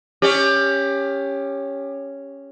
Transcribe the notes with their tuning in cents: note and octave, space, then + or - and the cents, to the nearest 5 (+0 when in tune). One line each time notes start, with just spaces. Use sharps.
C#4 +0 G4 +20 D5 +20